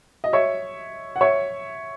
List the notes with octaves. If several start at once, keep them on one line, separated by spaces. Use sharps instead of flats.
D#5
C#5 E5
F#5
C#5 E5